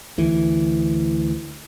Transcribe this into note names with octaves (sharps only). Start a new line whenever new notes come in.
D2 E3